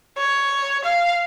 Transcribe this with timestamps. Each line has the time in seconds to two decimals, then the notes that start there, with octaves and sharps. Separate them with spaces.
0.18 C#5
0.84 F5